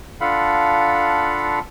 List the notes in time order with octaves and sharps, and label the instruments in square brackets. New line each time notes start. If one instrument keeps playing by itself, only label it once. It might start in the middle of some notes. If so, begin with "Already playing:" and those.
[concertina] D4 F4 A4 F5 F#5 B5